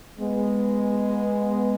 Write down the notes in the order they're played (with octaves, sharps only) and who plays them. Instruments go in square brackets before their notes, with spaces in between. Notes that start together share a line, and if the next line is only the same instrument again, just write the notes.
[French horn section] G#3 B3